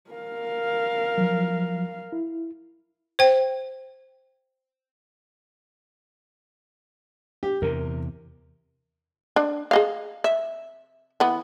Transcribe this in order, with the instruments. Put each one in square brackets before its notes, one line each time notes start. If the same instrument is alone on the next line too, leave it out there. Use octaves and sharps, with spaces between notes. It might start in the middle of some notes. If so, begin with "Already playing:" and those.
[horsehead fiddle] A#4 F5
[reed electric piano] F3 F#3
E4
[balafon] C5 G5
[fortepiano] G4
[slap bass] E2 C3 [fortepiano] A#4
[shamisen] D4
G#4 D#5 F5
E5
E3 B3